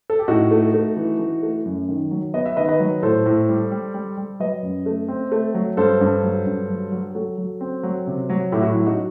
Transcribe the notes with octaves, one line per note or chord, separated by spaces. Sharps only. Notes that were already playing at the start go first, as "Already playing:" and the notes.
A4
G4
A2 D#4 F#4
A3
A3
E3
E3
A3
F#2
D#3
F#3
B3 D#5
E5
D#3 B4 D#5
B4 D#5
F#3
A2 A4 C5
A2
G3
G3
G3
G3
F#3 B4 D#5
F#2
A3
C4
A3
F#3
G2 A4 C5
G2
F#3
G2
F#3
F#3
G4
F#3 F#4 A4
F#3
C4
F#3
C3
F#3
A2 E4 G4
F#4
E4
F#3
D#4 F#4